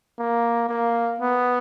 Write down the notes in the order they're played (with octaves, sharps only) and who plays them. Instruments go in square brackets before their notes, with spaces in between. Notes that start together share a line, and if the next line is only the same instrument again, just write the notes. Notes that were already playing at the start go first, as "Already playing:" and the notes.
[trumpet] A#3
A#3
B3